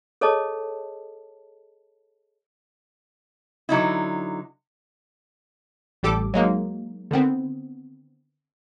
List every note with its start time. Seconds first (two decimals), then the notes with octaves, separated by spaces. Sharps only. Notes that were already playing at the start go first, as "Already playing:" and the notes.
0.21 G#4 A4 C#5 D#5 A5
3.69 D3 F#3 D#4 E4
6.03 A1 G3 G4 A4 D6
6.34 F#3 G#3 A#3 D#4
7.11 D3 D#3 B3 C4